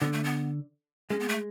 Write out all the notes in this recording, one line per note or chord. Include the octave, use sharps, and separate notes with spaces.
D3 B3
A3
B3
G#3 C#4
B3
A3